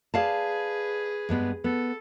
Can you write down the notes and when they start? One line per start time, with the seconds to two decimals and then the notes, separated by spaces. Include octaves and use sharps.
0.14 G#4 B4 D5 F5 A5
1.29 G2 G#3 B3
1.64 B3 A4